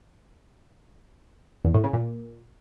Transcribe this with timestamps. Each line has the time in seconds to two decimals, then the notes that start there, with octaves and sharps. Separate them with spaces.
1.65 E2
1.74 A2
1.84 C#3
1.93 A#2